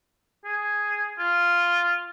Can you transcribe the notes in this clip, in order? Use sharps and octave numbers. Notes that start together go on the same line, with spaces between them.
G#4
F4